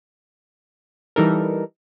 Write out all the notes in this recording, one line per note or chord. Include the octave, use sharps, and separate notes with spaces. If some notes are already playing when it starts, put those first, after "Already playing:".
E3 G3 D#4 A4 A#4